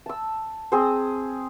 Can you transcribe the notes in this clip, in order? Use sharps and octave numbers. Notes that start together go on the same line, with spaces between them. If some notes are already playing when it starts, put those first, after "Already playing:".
A5 E6
C4 G#4 C5